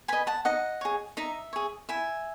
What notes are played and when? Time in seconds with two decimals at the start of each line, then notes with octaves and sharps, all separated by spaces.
0.08 B4 D#5 G#5 B5
0.27 F#5 A5
0.45 D#4 D#5 F#5
0.81 G#4 C#5
1.17 D#4 E5
1.53 G#4 C#5
1.89 E4 E5 G#5